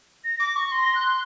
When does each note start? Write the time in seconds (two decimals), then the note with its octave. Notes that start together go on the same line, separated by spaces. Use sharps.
0.24 A#6
0.40 D6
0.56 C#6
0.71 C6 A#6
0.95 F#6